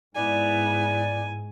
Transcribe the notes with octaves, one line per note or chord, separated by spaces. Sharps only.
G#2 B3 E4 D5 G#5